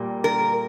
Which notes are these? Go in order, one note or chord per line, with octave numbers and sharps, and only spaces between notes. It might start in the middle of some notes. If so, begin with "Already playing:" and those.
Already playing: A#2 G3 A#3
A#4